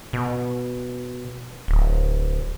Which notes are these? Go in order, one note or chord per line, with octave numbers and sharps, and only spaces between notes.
B2
D1